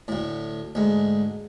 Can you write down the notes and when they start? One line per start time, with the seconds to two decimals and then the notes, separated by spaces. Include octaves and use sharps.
0.08 D2 A2
0.75 D2 G#2